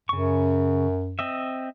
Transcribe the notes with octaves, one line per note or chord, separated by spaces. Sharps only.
F#2 C#3 C#6
C4 D#5 E5